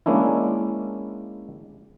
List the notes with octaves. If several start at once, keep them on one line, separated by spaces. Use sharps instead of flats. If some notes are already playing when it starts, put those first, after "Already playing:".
G#3 A#3 C#4 D4 E4